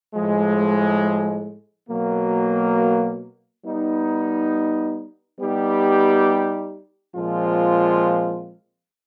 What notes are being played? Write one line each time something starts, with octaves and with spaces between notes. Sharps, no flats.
A2 F3 G#3
B2 F#3 A#3
G3 B3 D#4
G3 B3 D#4 G4
A#2 F3 G#3 C4 F4